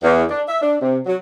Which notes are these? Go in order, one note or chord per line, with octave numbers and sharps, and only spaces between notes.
E2
D4
E5
D4
C3
F#3